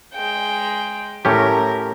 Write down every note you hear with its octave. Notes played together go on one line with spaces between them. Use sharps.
G#3 G5
A2 C#4 G4 A#4